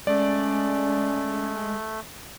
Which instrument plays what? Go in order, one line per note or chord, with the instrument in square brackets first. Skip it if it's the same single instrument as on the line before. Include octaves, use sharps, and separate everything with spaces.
[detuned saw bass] G#3 [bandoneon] A3 [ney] C#4 [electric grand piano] D5